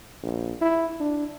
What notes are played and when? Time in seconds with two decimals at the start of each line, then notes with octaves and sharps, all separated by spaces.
0.23 A#1
0.62 E4
1.00 D4